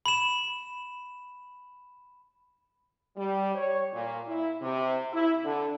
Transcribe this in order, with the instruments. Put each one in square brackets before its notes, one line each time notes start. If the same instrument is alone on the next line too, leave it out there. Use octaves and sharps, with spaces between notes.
[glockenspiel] B5 E7
[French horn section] G3
C#5
A#2
E4
C3
E4
D3